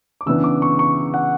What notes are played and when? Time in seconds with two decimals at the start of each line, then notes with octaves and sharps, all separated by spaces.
0.21 D6
0.26 C#3 E3 B3 D4 E6
0.44 D6
0.62 C#6
0.79 C#6
1.14 F#5